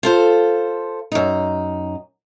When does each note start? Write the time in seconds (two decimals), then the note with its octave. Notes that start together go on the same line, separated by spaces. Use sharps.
0.03 F4 A4 C5
1.12 F#2 D#4